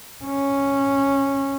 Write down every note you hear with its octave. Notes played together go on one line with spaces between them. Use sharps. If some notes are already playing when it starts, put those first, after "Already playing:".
C#4